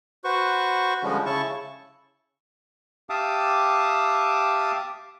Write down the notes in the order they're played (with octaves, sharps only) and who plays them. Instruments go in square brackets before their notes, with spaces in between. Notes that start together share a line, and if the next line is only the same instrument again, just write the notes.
[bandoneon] F#4 B4 C5 C#6
D3 F3 G3 G#3 C#4
C#3 E4 A5 C#6
G4 E5 F5 A5 D6 D#6